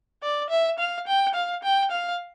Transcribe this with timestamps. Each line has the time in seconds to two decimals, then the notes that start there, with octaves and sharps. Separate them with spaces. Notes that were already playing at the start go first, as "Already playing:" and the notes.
0.23 D5
0.50 E5
0.79 F5
1.07 G5
1.34 F5
1.63 G5
1.91 F5